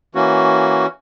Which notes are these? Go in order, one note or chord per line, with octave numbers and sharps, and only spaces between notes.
E3 A#3 C#4 F#4